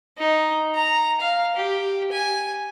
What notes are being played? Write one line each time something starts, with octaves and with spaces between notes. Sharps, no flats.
D#4
A#5
F5
G4
G#5